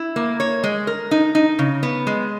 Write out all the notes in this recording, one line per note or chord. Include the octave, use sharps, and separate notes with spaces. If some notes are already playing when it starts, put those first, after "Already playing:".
Already playing: E4
A#3
C#5
G#3
A#4
D#4
D#4
C#3
B3
G#3